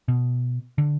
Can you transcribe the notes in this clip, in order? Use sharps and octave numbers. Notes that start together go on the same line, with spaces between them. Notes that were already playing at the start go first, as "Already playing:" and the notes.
B2
D3